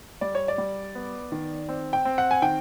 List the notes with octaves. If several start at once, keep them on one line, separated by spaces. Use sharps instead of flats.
G3 D5
C#5
D5
G3
B3
D#3
C4
G5
C4
F#5
G#5
D#3 G5